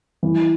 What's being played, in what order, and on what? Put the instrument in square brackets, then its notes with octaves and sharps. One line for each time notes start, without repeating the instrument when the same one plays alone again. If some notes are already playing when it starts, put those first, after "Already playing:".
[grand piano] E3